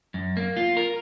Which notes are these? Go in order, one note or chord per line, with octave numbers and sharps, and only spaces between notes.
F#2
A#3
F4
A#4